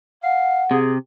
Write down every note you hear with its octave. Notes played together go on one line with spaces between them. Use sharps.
F5 F#5
C3 G#4